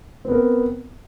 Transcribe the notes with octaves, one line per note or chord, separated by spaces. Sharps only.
B3 C4 A#4